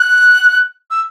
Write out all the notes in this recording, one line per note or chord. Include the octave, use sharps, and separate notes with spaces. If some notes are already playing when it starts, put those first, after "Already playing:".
Already playing: F#6
E6